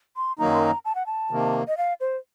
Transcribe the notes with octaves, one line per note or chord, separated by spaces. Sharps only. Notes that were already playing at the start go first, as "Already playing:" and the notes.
C6
F#2 D#3 F#3 A#3 D#4 A#5
C6
A#5
A5
F#5
A5
C3 D#3 A#3
D#5
F5
C5